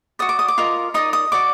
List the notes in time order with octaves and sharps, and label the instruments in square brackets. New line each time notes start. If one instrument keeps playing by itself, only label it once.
[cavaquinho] F#4 D5 D#6
D6
D#6
D6
F4 A#4 D#5
D#4 A#4 D5 D#6
D#6
F#4 D5 D6